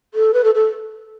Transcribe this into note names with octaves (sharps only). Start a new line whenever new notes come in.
A4
B4
A4
A4